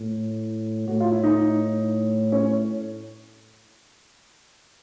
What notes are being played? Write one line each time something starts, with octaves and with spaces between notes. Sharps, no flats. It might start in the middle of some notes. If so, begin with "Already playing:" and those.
Already playing: A2
A2 F#4
F4
E4
D#4
C#4